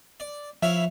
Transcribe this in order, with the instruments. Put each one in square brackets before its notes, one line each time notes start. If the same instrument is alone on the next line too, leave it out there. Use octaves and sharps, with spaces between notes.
[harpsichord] D5
[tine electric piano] F3 [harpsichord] E4 C#5 F5 [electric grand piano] E5